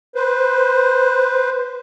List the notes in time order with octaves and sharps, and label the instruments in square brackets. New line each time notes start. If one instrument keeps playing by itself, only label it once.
[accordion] B4 C5